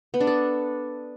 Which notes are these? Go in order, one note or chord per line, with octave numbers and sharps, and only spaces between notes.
B3
D4
A4